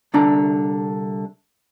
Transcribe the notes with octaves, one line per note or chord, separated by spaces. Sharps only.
C2 D3 D4 A#5